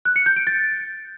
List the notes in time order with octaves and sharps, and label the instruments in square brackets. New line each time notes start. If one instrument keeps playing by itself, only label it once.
[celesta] F#6
C#7
G6
D7
A6